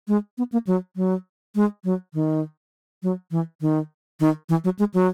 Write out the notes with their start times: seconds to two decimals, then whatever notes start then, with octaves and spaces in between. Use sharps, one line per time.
0.08 G#3
0.38 B3
0.52 A#3
0.67 F#3
0.96 F#3
1.55 G#3
1.84 F#3
2.14 D#3
3.03 F#3
3.31 E3
3.61 D#3
4.20 D#3
4.49 E3
4.64 F#3
4.79 G#3
4.94 F#3